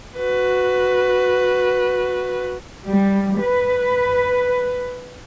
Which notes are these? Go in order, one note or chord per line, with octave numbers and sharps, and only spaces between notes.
F#4 B4
G3
B4